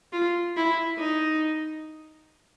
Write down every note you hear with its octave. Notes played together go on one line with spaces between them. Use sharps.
F4
E4
D#4